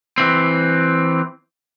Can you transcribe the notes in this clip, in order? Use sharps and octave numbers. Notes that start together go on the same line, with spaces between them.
E3 C4